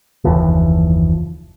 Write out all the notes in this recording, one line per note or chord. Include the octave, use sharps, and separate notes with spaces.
F#1 D#2 E3 F3